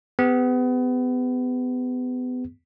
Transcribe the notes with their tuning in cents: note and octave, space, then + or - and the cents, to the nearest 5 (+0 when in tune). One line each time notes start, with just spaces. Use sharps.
B3 +30 G#4 -40